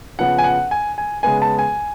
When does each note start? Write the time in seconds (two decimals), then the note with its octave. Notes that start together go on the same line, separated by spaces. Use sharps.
0.19 C#3 F3 B3 F#5
0.38 G#5
0.44 F#5
0.71 G#5
0.98 G#5
1.23 C#3 G#3 B3 G#5
1.42 A5
1.59 G#5